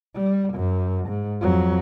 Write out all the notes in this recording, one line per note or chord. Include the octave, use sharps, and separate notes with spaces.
G3
F#2
G#2
F2 F#3